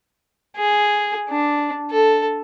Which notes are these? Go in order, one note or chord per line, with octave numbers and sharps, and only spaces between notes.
G#4
D4
A4